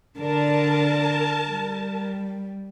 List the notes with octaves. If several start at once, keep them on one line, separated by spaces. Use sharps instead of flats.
D3 A#4 D5 A5
G3